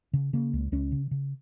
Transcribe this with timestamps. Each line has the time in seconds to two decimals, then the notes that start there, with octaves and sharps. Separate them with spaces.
0.13 C#3
0.33 C#3 A#3
0.53 C#2
0.72 C#2 C#4
0.92 C#3
1.11 C#3